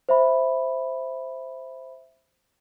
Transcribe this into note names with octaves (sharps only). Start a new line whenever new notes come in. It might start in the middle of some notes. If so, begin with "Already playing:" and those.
C5 E5 B5